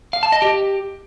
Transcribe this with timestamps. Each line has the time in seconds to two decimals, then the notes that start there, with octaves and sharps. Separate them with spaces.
0.13 F5
0.23 A5
0.32 D#5
0.42 G4